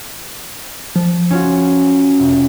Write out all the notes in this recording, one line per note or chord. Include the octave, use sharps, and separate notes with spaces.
F3
C#4 F4 F#4
F1